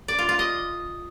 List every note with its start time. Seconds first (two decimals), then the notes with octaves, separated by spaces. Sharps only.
0.08 D5
0.19 F4
0.29 F4
0.39 D#5